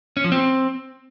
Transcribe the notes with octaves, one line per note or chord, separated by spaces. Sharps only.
C#4
F3
C4